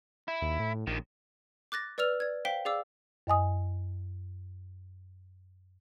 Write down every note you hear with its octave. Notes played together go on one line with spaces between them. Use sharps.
E4
D#2
A2
A#1 D#2 D#3
D6 F#6 A6 A#6
B4 D5 E6 F6 F7
D5 G#6
C5 F5 G5 B6 G7
G#4 D5 F5 D6 E6
F#2 D#5 G#5 D#6